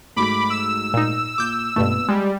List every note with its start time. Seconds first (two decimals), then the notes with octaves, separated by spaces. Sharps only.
0.16 G#2 F#3 A3 B5 D6
0.50 E6
0.94 A#2 D#4
1.38 A#2 D6 G6
1.76 A#1 G2 B2 A3 B3
2.09 G3 G#3 A6